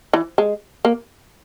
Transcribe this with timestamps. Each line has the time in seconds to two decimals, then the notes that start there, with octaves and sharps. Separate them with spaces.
0.13 E3
0.38 G#3
0.85 A#3